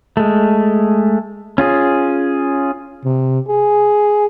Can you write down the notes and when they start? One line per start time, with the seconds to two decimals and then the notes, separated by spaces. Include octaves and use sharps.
0.17 G#3 A3
1.58 C#4 F4 G#4
3.05 C3
3.49 G#4